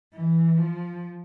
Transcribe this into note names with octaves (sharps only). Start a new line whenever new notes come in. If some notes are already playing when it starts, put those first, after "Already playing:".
E3
F3